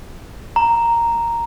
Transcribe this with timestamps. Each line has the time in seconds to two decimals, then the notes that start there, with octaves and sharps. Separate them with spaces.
0.56 A#5